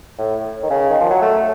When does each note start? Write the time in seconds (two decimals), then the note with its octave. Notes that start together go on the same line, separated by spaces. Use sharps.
0.18 A2
0.63 D#3
0.70 C#3
0.90 D#3
1.00 F3
1.10 F#3
1.21 A3